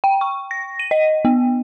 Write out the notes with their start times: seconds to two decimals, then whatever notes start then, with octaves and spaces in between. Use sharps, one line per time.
0.04 G5
0.21 C#6
0.51 A#6
0.79 D#7
0.91 D#5
1.25 B3